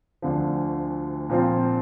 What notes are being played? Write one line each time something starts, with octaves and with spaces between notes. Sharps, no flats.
D2 D3 F3
A#2 F3 C4 F4